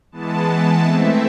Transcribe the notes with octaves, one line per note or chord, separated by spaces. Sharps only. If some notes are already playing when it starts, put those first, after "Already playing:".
E3 G#3 B3 A5
E3 A3 C4 E5